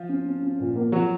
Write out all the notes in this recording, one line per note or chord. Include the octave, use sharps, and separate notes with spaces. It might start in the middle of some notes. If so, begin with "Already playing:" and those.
Already playing: F3 F4
C#4
C#4
C#4
A#2
A#3
F3 F#3 F#4